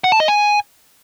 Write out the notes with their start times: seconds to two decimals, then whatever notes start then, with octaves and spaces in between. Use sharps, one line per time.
0.04 F#5
0.12 A5
0.20 D#5
0.28 G#5